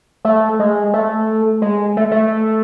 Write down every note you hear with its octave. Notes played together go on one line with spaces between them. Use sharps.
A3
G#3
A3
G#3
A3
A3